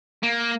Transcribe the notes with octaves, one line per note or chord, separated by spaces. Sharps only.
A#3